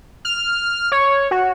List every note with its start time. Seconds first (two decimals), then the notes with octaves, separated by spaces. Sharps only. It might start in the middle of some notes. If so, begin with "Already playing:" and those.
0.25 F6
0.92 C#5
1.31 F#4